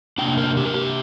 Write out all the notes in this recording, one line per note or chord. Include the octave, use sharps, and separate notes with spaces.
C3 A#3 D4 G5
A#4
G4
A#4
G4